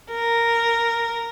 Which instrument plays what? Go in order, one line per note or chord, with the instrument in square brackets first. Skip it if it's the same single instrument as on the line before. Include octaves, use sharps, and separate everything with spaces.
[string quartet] A#4